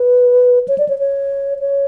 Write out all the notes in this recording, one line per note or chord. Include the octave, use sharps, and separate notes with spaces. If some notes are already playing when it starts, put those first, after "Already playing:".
Already playing: B4
C#5
D5
C#5
C#5
C#5